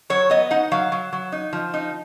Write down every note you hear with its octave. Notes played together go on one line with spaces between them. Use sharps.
F#3 C#5
B3 D#5
D#4 F#5
F#3 F5
F#3
F#3
D#4
F3
D#4